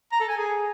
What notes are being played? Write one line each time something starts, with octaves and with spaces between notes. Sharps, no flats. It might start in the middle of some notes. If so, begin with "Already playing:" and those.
A#5
A4
G#5
G#4